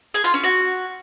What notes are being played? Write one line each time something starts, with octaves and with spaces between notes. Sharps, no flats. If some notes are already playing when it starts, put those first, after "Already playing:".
G#4
F4
C#4
F#4